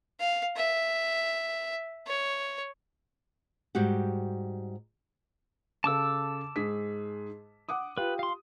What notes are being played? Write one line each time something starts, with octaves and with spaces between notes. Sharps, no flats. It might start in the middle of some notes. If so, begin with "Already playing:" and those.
F5
E5
C#5
G#2 G3 F#4 G4
C#3 A4 A5 D6 E6
G#2 G#4 B6
F#5 D6 D#6
F4 G4 B4
F5 C6